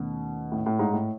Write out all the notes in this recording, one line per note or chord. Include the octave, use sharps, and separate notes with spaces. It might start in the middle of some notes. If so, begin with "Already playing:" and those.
Already playing: D#2 B2 D#3 A3 C#4
A2
A2
G#2
A2